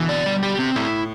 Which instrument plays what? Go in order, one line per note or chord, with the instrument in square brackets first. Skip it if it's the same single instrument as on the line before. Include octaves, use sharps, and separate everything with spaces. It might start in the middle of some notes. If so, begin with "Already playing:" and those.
Already playing: [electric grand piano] B2 D3 [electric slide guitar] E3
[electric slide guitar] D5
G3
G4
C4
[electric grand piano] A2 [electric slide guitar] E4